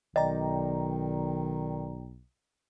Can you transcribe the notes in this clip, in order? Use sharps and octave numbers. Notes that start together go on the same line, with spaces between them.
B1 D#3 D5 D#5 G5 A#5